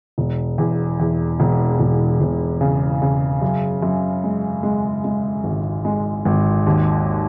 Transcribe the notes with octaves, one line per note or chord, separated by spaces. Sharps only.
E1
E2
E2
E1
E1
E1
C#3
C#3
F#2
F#2
G#3
G#3
G#3
G#1
G#3
G#1
D#2